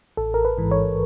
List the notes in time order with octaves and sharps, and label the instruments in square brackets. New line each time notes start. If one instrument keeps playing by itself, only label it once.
[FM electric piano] A1 A4
A#4
B4
G#2 E3
C#5